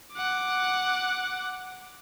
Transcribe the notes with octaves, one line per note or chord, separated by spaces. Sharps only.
F#5 D6